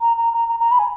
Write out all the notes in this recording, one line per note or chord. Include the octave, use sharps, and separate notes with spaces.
A#5
A#5
A#5
A#5
A#5
B5
G#5